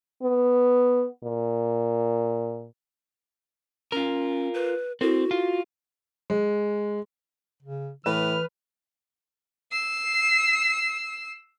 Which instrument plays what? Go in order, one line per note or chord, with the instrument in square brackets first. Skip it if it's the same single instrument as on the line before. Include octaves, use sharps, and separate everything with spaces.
[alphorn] B3
A#2
[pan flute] C#4 [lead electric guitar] F4 A#4
[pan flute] B4
[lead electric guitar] C4 [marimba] E4 A4 A#4 [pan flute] F#4
[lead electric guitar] F4
[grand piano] G#3
[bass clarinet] C#3
[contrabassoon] A2 [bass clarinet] E3 [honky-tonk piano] B4 [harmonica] F6
[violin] E6 C7